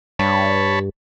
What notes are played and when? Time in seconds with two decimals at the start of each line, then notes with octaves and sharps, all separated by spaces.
0.19 G2 C#5 A5 B5